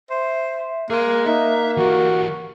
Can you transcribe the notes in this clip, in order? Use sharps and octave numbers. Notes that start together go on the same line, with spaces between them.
C5 E5
A#3 G#4 C6 F#6
A#3 D#4 E5
E3 F#4 G4 A#4